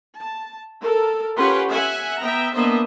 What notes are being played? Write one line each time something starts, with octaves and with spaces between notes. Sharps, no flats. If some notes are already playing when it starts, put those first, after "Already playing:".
A5
A4 A#4
C#4 F4 G4 B4 F#5 C6
E5 F#5 G#5
B3 E5 G5 A#5
A#3 B3 D4 C5 D#5 E5